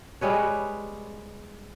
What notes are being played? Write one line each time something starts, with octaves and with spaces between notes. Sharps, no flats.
G3 G#3 B4 C#5